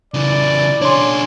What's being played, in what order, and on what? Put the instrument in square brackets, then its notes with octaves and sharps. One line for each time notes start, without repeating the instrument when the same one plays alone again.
[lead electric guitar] C#3 E3 [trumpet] D5
[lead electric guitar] D4 G#4 [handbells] C#5 C6